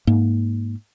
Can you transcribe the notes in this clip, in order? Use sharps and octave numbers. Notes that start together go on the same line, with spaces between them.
G#2 A#3